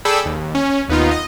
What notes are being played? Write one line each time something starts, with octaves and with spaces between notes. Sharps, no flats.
G#4 A4 D5 G5 B5 E6
D#2
C#4
D#2 B3 D#4 F4
D#5